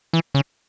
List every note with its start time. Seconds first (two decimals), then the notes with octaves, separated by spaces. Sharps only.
0.13 E3
0.34 C#3